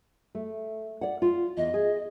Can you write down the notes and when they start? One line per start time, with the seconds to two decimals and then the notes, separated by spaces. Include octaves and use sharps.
0.35 A3
1.01 D5 F#5
1.22 F4
1.57 E2 D#5
1.74 G#4